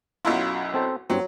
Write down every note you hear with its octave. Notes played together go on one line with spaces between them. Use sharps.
B1 F#2 E4 F4
C4 A4 C5
G2 F#3 C4